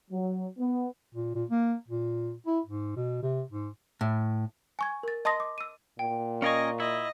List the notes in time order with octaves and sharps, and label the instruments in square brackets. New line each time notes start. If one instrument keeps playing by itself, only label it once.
[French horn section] F#3
B3
[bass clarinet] A#2
A#2
A#3
A#2
E4
G#2
B2
C3
G#2
[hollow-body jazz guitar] A2
[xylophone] G#5 C#6 G#6
A#4 A6
D#5 A5 C6 D#6 A#6
D6
E6 D#7
[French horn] A#2 [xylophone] G5
[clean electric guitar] C#4 A#4 G#5 [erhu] D#5 [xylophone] F5 A#5 C#6
[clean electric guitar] E4 [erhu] D#5